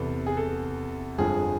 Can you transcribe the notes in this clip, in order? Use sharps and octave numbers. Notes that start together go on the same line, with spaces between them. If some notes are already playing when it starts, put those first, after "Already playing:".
Already playing: E2 C3 E3 A4
G#4
A4
G1 F2 D3 F3 G#4